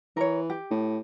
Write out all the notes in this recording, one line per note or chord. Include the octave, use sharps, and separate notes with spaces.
E3 A#4 C#5
G4
A2